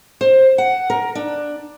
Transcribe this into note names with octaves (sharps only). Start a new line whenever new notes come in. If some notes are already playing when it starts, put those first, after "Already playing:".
C5
F#5
A#4
D4